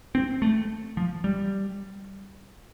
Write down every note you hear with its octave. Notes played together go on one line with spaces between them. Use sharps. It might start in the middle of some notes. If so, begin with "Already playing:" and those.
C4
A3
F3
G3